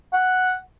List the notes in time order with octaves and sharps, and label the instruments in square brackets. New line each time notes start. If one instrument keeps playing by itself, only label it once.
[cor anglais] F#5